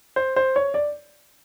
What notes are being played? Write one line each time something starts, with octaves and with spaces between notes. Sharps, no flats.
C5
C5
C#5
D5